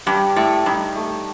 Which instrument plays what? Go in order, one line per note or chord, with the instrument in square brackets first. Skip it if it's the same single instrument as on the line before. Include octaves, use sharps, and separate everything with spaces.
[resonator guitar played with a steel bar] G2 [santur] G4
[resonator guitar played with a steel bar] A2 [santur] A3
[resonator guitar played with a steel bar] G2 [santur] D#4
[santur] A3